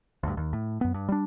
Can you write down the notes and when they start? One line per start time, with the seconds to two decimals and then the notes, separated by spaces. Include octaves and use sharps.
0.23 D2 G2
0.37 D#2
0.53 A2
0.81 F#2 B3
0.94 G2
1.09 G3 D4